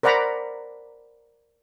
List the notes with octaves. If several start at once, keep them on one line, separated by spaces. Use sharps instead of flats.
A#4 C5 D5 F#5 A#5 B5